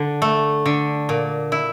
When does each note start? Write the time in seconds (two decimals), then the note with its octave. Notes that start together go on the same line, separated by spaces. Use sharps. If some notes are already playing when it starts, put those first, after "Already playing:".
Already playing: D3
0.22 A3
0.66 D3
1.09 A#2
1.52 E4